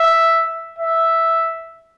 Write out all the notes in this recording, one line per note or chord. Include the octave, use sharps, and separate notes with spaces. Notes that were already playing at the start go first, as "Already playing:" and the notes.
Already playing: E5
E5